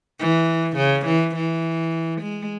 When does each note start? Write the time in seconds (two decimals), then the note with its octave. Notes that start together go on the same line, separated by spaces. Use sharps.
0.19 E3
0.77 C#3
1.07 E3
1.36 E3
2.22 G#3